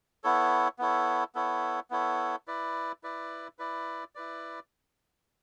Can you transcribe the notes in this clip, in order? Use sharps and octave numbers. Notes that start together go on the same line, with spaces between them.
B3 E4 A4 C#5
B3 E4 A4 C#5
B3 E4 A4 C#5
B3 E4 A4 C#5
E4 B4 D5
E4 B4 D5
E4 B4 D5
E4 B4 D5